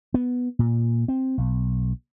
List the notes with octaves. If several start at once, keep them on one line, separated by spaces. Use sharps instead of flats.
B3
A#2
C4
B1